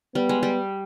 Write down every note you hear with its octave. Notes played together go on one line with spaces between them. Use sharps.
G3 B3
G#3
G3